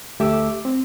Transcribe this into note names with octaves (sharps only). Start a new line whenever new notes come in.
D2 A3 G4 E5 D6 E6
C4